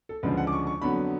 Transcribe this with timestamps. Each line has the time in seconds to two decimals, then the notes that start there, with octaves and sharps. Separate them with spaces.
0.09 A4
0.23 D2 C#3 F3 G#3 B4
0.37 F#5
0.47 D6
0.52 C#6
0.67 C#6
0.81 F2 D3 F#3 B3 B5